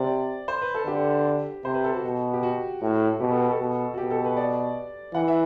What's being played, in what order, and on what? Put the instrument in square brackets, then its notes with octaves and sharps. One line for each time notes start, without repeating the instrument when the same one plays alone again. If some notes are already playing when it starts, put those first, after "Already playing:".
Already playing: [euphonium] C3 [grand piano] D5
[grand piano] C5
B4
A4
[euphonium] D3 [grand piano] G4
[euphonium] C3 [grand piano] C5
[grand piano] B4
A4
F#4
[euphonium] B2
[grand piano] G4
F#4
[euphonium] A2
[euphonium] B2 [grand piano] G4
[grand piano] A4
B4
A4
[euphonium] B2
[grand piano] F#4
[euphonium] B2 [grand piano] G4
[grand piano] A4
B4
D5
[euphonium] E3 [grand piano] F#5
[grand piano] E5